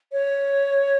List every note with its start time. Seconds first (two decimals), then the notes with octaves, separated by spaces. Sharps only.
0.12 C#5